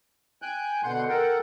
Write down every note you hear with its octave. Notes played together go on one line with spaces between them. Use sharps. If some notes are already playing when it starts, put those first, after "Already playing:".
G5 G#5 F#6 G6
B2 D3 F#5 C6 G6
A4 A#4 F#5 G5